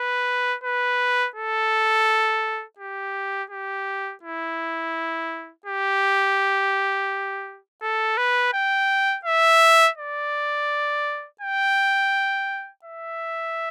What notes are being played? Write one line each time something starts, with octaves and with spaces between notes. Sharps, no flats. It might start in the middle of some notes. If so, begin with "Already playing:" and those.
Already playing: B4
B4
A4
G4
G4
E4
G4
A4
B4
G5
E5
D5
G5
E5